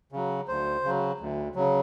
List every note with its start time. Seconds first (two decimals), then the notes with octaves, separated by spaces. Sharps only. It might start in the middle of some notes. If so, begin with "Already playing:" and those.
0.12 C#3 F#3
0.48 D2 C5
0.84 C#3 F#3
1.20 D2
1.55 C#3 F#3